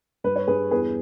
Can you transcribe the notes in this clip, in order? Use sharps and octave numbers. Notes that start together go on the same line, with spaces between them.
G2 B4
C#5
G2 G#4 B4
E2 G#4 B4